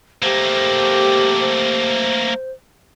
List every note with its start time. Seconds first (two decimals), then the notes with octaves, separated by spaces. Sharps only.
0.22 A3 A#3 G4 C5
1.40 C5